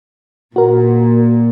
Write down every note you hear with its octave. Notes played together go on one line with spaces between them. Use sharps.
A#2 F#4 A#4